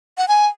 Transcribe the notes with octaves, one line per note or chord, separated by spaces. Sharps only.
F#5
G#5